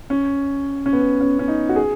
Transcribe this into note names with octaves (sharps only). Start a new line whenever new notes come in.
C#4
C#4
B3
C#4
C#4
D#4
F#4
G#4